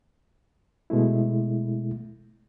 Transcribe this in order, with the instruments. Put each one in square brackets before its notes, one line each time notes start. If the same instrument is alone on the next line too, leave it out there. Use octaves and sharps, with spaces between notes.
[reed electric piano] B2 G#3 A3 E4